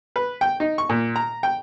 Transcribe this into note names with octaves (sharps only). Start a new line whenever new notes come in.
B4
G5
D#4
C#6
A#2
A#5
G5